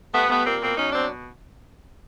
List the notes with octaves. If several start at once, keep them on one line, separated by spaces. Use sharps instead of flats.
G3 A3 B3
G3 A3 B3
A#2 A#3 C4
B2 A#3 C4
F#3 C#4 D#4
B2 C4 D4